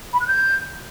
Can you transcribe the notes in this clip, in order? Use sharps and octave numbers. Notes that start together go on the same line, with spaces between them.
B5
F#6
G6